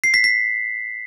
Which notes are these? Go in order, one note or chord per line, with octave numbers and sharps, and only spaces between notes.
C7
B6
B6